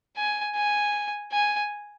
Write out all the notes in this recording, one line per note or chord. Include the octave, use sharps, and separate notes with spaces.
G#5
G#5
G#5